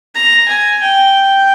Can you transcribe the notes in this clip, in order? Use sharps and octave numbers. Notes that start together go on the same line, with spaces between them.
A#5
G#5
G5